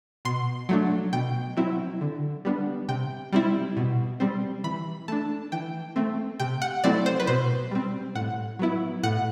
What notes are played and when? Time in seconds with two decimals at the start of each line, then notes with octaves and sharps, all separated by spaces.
0.25 B2 C6
0.69 F#3 A3 D4
1.13 B2 G5
1.57 F#3 C4 E4
2.01 D3
2.45 G3 B3 D4
2.88 C3 G5
3.33 G3 C4 E4
3.77 B2
4.20 G3 C4
4.64 E3 B5
5.08 A3 D4 A5
5.52 E3 G5
5.96 A3 C4
6.40 C3 G5
6.62 F#5
6.84 F#3 A3 C4 E4 D5
7.06 C5
7.20 B4
7.27 B2 C5
7.71 G3 C4
8.15 A2 F#5
8.59 F#3 B3 E4
9.03 A2 F#5